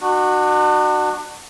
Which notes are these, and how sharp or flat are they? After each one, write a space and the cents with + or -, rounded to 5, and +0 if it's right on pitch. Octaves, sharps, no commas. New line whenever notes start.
D4 +35 F#4 +0